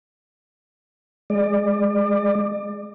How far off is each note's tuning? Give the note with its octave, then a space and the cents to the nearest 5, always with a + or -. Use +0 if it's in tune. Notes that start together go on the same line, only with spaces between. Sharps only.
G#3 +0 D5 +30